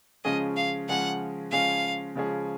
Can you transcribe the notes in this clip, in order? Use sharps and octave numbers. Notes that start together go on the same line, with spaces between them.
C#3 F3 G#3 C#4 G#4 D#5
F5
C#3 F3 G#3 C#4 G#4 F#5
C#3 F3 G#3 C#4 G#4 F5
C#3 F3 G#3 C#4 G#4